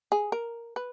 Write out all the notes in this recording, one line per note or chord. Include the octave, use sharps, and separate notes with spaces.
G#4
A#4
B4